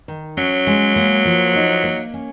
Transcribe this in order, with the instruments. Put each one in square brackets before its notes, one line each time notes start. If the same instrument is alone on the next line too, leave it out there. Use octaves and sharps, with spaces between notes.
[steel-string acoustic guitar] D#3
[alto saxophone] F#3 [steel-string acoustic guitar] C#4
[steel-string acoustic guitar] G#3
A#3
F3
D#4
A#3
C#4